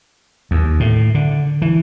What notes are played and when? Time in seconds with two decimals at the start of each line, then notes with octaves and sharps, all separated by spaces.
0.51 D#2
0.80 A2
1.15 D3
1.62 E3